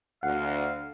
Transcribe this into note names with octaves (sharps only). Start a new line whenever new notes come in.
D2 F5 F#5